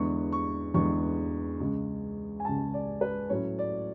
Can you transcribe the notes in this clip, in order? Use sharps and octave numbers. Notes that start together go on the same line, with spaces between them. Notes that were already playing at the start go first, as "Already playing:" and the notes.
Already playing: E2 D3 G#3 B3 C#6
C#6
E2 D3 G#3 B3 C#6
C#2 C#3 G#3
G#5
C#2 C#3 G#3 A5
D5
B4
A2 F#3 C#4 C#5
D5